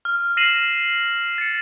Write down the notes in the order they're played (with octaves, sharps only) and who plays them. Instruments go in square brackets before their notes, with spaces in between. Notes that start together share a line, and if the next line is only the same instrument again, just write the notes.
[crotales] F6
F6 A#6 C7 D#7 E7 F#7
A6 C#7